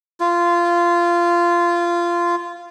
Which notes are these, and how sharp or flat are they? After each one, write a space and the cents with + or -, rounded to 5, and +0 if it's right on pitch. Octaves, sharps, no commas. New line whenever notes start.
F4 -15